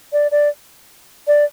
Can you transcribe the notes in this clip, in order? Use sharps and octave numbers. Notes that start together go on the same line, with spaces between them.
D5
D5
D5